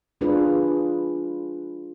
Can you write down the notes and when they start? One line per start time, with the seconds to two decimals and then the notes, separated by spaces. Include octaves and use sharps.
0.21 G#3 D4 F4 G#4 B4